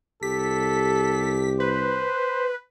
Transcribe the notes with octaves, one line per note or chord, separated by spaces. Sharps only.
C2 G4 A4 B6
B4 C5